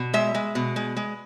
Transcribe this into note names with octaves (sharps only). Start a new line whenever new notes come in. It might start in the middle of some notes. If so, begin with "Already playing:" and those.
Already playing: B2
G#3 E5
G#3
B2
G#3
G#3